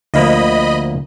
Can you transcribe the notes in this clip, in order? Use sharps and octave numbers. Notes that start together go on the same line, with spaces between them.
D2 F3 A#3 D#5 B5